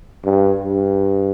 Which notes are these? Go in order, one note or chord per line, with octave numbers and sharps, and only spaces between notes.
G2
G2